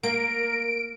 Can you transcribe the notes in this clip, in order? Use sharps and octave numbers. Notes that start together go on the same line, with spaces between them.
A#3 A#4 D7